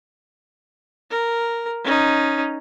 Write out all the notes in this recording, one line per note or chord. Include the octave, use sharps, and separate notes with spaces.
A#4
C#4 D#4